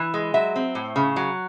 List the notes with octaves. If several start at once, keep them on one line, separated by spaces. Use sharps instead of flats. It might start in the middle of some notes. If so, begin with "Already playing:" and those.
Already playing: E3
G#3
F#3 E5
C4
A2
C#3
F#3